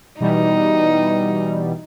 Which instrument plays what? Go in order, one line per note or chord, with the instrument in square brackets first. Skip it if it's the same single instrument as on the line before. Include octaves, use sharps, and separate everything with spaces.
[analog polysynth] B2 E3 G3 [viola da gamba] D#4